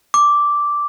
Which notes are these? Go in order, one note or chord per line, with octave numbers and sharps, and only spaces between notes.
D6